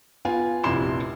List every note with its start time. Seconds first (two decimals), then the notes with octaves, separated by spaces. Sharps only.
0.25 B3 F4 G#5
0.64 F1 A#1 C3 E4 C6 E7